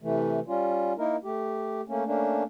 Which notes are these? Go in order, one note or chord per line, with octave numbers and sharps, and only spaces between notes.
C3 E3 A3
G3 C#4 F4
A#3 D#4 E4 A#4
A3 G4
A3 A#3 C#4
A3 A#3 C#4 D4